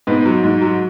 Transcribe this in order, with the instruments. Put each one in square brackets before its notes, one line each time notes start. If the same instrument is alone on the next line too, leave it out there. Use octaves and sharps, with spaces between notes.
[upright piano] G#2 B3
F#3
G#2
F#3